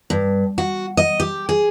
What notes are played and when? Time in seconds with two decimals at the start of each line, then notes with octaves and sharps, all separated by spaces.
0.10 G2
0.58 F#4
0.97 D#5
1.20 G4
1.49 G#4